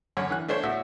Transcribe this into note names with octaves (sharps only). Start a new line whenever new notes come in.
F#2 D3 C#5
E3 F#6
A3 D4 C5 C#5
A2 F#4 E5